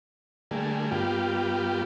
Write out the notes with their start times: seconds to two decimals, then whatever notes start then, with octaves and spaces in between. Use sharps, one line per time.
0.51 D3 G3 A3 A#3 G#4
0.91 G2 G3 A#3 B3 F4 G4